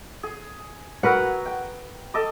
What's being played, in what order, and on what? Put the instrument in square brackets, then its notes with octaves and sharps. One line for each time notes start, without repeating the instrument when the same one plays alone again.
[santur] G#4
[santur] F#3 [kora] A#4 B4 F#5
[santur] G5
A4 D#5 D6